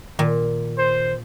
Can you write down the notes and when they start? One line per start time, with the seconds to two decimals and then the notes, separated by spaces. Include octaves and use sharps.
0.19 A#2 D#3
0.77 C5